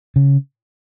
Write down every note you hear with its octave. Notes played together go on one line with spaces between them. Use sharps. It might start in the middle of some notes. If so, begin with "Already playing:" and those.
C#3